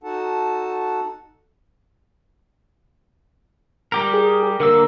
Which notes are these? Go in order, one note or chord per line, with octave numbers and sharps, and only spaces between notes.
D#4 F#4 A4 F#5 A5
G3 G4 A#4
G#4
D3 A#3 A#4 E6